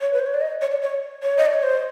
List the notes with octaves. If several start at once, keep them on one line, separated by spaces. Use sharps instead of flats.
C#5
B4
C5
C#5
D5
D#5
C#5
D5
C#5
C#5
D#5
D5
C#5
C5